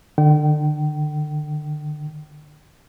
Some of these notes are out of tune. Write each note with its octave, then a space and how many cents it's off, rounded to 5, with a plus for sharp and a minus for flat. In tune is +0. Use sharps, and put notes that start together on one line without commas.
D3 +30 G5 -35